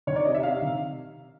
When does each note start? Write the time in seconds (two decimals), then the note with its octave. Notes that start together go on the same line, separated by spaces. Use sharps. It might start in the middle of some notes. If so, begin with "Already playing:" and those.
0.07 D#3 C#5
0.16 D5
0.25 C3 D#5
0.35 E5
0.43 C3 F5
0.62 D#3